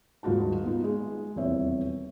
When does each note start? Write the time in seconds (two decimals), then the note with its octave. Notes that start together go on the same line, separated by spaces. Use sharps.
0.23 D#1 G#2 F4 F#4 A5
0.63 B3 D#4 F4
0.84 G#3
1.36 D#1 E2 C3 C#5 E5